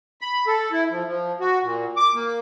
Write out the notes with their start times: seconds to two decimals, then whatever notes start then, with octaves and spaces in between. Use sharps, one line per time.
0.21 B5
0.47 A4
0.72 E4
0.91 F3
1.07 F3
1.40 F#4
1.62 A#2
1.97 D6
2.14 A#3